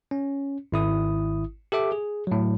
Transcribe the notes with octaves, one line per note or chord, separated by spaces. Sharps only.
C#4
G#1 E4 D#6
G4 A4 E5 D6
G#4
A2 F#3